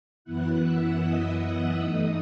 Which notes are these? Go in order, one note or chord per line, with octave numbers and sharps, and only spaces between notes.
F#2 E3 B3 E4 F#5 F#6
E5 E6
D#5 D#6
G2 E3 A3 D#4